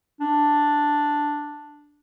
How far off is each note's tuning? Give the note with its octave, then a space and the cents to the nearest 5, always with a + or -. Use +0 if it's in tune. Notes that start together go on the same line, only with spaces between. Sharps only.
D4 +0